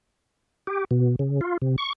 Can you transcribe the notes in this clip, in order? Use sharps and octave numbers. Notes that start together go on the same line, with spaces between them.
G4
B2
C#3
F4
C3
C#6